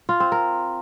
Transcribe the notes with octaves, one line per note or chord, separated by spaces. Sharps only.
F4
C4
A#4